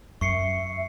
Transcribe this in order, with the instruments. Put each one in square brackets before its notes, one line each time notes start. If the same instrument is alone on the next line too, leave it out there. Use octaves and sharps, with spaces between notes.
[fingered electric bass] F#2 [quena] E5 [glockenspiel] C#6 C7 C#7